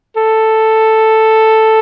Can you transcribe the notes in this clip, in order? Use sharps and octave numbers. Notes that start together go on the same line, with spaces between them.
A4